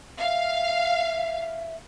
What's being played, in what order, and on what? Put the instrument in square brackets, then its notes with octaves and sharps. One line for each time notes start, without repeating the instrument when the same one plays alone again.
[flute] E5 [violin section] F5